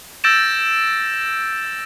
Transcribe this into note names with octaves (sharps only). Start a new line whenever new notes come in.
E6 G6 A6 A#6 D7 E7